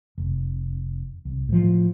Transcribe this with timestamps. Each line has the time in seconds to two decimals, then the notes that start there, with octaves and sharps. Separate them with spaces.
0.18 F1
1.25 C2
1.49 A2 F3